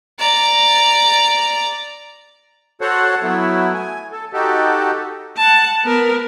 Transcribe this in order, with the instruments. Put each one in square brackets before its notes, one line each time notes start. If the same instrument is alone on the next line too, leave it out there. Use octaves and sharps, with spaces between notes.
[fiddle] D5 A#5
[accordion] F#4 A4 C5 C#5 F#5
F#3 A3 B3 E4
G#5
A4
D#4 F#4 G4 A4
[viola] F#5 A5
B3 A#4